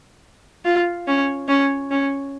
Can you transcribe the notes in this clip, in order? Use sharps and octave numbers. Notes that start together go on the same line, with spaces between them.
F4
C#4
C#4
C#4